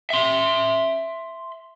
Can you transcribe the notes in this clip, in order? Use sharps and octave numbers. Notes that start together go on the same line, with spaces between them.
E5 C6